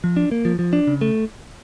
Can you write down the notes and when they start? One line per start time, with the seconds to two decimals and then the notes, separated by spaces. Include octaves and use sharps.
0.04 F3
0.17 D4
0.31 A#3
0.45 F3
0.59 F3
0.73 D4
0.87 C#3
1.01 A3